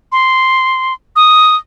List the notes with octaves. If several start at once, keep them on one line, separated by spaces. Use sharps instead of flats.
C6
D#6